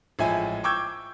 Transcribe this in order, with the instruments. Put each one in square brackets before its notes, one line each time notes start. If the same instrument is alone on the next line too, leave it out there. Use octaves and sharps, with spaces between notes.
[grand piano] A1 F3 G#3 E5 G#5
G5 C#6 D6 E6 G6 G#6